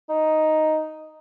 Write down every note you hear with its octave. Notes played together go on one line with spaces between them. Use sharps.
D#4